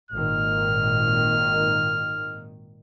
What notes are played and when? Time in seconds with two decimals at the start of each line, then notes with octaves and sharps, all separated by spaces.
0.11 G#1 A#2 D#3 F6